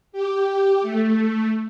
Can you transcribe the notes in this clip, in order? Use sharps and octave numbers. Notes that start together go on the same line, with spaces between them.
G4
A3